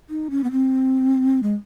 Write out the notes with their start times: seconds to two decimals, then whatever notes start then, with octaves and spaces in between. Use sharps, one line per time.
0.10 D#4
0.30 C#4
0.44 B3
0.51 C4
1.43 G#3